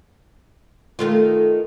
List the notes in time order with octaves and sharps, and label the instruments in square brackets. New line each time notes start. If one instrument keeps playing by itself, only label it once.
[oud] D#3 A3 F4